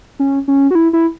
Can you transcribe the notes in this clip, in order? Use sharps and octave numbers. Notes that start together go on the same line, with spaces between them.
C#4
C#4
F#4
E4
E4